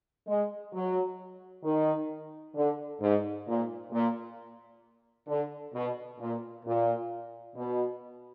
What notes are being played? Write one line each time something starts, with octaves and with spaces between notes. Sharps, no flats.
G#3
F#3
D#3
D3
G#2
A#2
A#2
D3
B2
A#2
A#2
B2